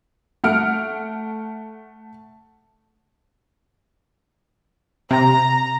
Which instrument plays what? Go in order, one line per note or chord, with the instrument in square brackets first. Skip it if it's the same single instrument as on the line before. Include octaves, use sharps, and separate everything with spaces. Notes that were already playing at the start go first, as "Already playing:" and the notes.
[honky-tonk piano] A3 F#5 F6 D7
[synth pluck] C3 [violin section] A#5